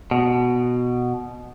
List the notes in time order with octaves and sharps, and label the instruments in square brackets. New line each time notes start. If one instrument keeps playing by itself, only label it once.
[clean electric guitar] B2